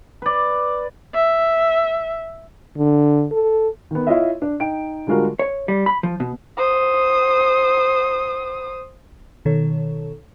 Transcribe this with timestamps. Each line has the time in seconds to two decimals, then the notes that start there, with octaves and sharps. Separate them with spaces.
0.22 B4 D5
1.14 E5
2.78 D3
3.32 A4
3.91 D#3 B3
4.07 E4 F4 C#5 D#5 E5
4.42 D4
4.60 D#4 G5 D7
5.07 D3 G3 G#3 F4 F#4 A#4
5.39 C#5
5.68 G3
5.86 B5
6.03 F3
6.20 B2
6.58 C5 D#6
9.45 B2 D#3 A4 C#5